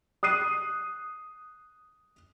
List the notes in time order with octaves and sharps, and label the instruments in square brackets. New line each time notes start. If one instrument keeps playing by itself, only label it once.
[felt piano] D#6 F#6 C7 D#7